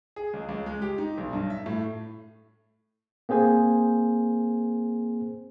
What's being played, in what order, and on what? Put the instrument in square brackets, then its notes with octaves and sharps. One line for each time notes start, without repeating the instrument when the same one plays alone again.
[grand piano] G#4
C#2
C#2
G#3
G4
D#4
B1
G2
E5
A2
[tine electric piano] A#3 C4 G#4 C5 G#5